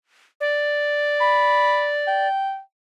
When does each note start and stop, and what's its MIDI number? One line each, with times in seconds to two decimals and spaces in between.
0.41 2.28 74
1.21 1.89 83
2.07 2.60 79